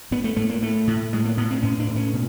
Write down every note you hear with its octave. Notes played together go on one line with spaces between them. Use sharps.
A2 B3
A3
A2 A3
A#3
A2 A3
A2
A2 G#3
A#3
A2 B3
C4
A2 C#4
D4
A2
C#4
B2